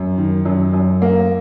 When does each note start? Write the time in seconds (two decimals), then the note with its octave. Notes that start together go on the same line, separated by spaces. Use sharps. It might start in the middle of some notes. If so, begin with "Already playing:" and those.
Already playing: F#2
0.18 D#3
0.45 F#2
0.74 F#2
1.02 A#3